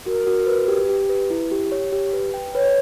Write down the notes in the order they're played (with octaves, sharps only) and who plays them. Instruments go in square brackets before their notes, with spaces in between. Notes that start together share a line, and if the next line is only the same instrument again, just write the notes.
[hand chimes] F#4 [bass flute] A#4
[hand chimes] F#4
B4
G4
G4
B4
E4
G4
C#5
G4
B4
G5
[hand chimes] B4 [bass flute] C#5